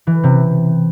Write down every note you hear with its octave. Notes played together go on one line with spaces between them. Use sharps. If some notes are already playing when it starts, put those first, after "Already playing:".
E3
C3